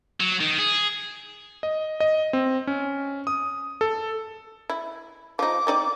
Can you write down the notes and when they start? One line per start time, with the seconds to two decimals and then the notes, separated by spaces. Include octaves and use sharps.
0.20 F#3
0.40 D#3
0.59 G#4
1.63 D#5
2.00 D#5
2.33 C4
2.67 C#4
3.27 D#6
3.81 A4
4.70 E4
5.39 F3 D#4 D6
5.67 C4 D#4 D5